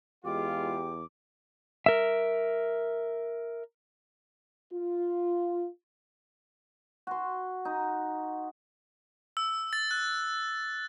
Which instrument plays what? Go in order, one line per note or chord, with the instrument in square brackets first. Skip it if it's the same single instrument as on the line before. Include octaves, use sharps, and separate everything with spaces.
[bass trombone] E2 [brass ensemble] G#3 F4 [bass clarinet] G4 [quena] D6
[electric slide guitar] A#4 E5
[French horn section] F4
[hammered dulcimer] F#4 C6
D#4
[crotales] E6
A6
F#6